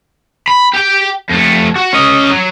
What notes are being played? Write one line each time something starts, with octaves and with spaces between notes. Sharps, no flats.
B5
G4 G5
F2 A3
F#4
C#4 D#5
F#3